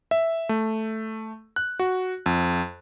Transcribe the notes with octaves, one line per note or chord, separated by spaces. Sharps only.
E5
A3
F#6
F#4
F2